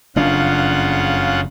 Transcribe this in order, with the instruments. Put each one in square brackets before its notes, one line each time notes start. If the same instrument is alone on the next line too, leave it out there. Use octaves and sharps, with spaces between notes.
[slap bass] F#1 F2 D4 [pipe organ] C#3 F4 F#5